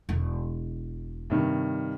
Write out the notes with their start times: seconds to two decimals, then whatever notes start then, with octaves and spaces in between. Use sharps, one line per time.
0.09 E1
1.30 G2 C3 D#3